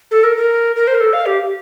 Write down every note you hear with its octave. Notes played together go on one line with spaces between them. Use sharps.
A4
A#4
A#4
A#4
C5
A#4
A4
F5
G4